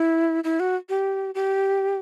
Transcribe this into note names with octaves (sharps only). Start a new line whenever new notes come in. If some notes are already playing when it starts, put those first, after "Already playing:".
Already playing: E4
E4
F#4
G4
G4